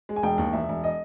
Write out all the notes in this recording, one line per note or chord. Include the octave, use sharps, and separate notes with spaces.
G#3
G#5
E1 G5
D#2
E1 E5
E1
D#5